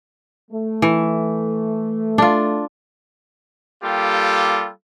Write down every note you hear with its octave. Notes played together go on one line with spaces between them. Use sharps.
A3
E3
D4 F4
G3 A#3 F4 G4 A4